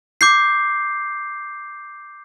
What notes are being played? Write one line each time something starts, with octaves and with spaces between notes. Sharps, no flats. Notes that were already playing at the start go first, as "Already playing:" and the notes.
D6 G6 C7